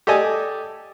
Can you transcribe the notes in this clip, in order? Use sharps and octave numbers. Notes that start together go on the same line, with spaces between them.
G4 A4 D5 D#5 G#5